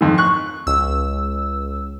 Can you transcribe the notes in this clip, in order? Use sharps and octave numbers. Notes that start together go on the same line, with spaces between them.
F2 D#3
C#6 F#6
C#2 E6